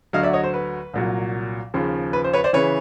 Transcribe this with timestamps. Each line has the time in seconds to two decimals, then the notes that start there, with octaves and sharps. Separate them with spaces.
0.13 D2 D3 F#3 D#5 F5
0.23 D5 E5
0.33 C#5 D#5
0.43 C5
0.54 B4
0.94 C2 A#2 F#3
1.74 D#2 C#3 F3
2.13 B4
2.24 C5
2.33 B4 C#5
2.44 C5 D5
2.53 C#3 E3 B4 C#5